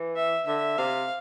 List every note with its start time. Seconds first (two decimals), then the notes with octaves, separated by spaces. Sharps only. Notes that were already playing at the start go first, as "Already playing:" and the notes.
Already playing: E3
0.16 E5
0.47 D3 E5
0.78 C3 F5